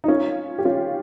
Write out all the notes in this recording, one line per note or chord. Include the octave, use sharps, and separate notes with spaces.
D#4
C#4 F4
G4
C#4 F4